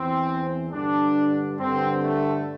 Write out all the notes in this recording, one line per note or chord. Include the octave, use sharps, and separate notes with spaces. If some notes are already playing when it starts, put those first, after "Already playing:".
Already playing: E2 E3 C4
G2 D3 D4
G2 D3 C4
A3